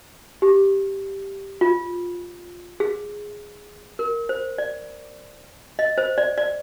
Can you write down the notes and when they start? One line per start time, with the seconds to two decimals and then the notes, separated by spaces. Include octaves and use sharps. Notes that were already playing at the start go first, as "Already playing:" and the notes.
0.42 G4
1.61 F4
2.80 G#4
3.99 A#4
4.29 C5
4.58 D5
5.79 D#5
5.98 C5
6.18 D5
6.38 D5